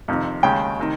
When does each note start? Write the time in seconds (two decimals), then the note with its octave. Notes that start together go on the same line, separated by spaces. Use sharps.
0.08 F2 C3 D#3
0.43 D#2 C#3 G#3 G5
0.80 C3 D#3